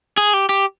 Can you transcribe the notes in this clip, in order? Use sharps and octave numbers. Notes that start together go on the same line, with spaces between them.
G#4
G4
G4